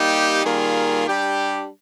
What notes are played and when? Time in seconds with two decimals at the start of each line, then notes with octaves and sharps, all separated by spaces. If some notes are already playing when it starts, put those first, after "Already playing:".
Already playing: G3 A#3 D#4 G4
0.44 D#3 G3 A#3 F4 G#4
1.06 G3 D4 G4